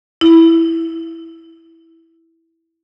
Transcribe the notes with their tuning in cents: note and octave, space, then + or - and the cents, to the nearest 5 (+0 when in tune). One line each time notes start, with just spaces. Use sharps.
E4 -5